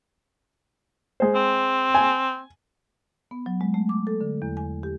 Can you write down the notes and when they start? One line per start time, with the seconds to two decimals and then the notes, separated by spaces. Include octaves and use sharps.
1.20 G#3 C5
1.35 C4
1.95 G#5
3.31 B3
3.46 F#3
3.61 G#3
3.74 A3
3.89 D6
4.07 A4
4.21 D3
4.42 E2
4.57 G#5
4.83 G4